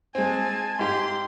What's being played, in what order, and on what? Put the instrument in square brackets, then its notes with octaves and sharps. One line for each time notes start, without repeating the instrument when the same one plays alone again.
[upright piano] G#3 C4 [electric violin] G#5 A5
[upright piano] G#2 G4 [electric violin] C6